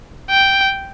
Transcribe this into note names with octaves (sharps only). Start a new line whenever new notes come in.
G5